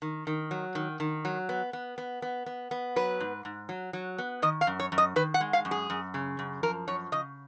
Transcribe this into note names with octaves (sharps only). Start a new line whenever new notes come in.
D#3
D#3
F#3
D#3
D#3
F#3
B3
B3
B3
B3
B3
B3
F#3 B4
G#2
G#2
F#3
F#3
B3
D#3 D#5
F5
F#2
C#5
F#2
D#5
D#3 B4
F#5
G#3
F5
F#2
G#4
F#2
C#3
F#2
F3 A#4
F#2 C#5
C#3 D#5